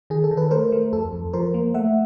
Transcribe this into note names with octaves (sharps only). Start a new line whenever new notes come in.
D#3 G#4
A4
D#3
A4 B4
A3 A#4 C5
A3
F2 A4
F2
F3 A#4 C5
A#3
A3 E5 F#5